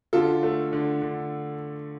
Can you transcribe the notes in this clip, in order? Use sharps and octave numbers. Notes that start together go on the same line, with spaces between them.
D3 F4 A4
A3
D3
D3